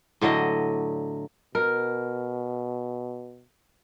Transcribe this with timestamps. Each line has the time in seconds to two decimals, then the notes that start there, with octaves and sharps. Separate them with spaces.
0.21 A2 D3 F#3 D#5
1.55 B2 A#4